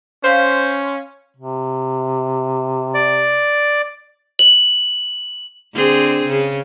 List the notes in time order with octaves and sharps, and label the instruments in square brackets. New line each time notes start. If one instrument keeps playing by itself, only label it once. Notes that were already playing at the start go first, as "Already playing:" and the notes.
[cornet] C#4 [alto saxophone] C5 [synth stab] F5 C6 B6
[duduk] C3
[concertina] D5
[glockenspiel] F#7
[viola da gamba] D3 C4 G#4
C#3